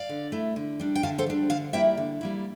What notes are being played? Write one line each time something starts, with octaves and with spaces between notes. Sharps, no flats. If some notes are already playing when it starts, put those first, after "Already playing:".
Already playing: D5 F5
D3
A3 E4
D3
G3 D4
G5
D3 F5 A5
A4 C5
G3 D4
D3 F5 A5
G3 A#3 E4 E5 G5
D3
G3 A#3 E4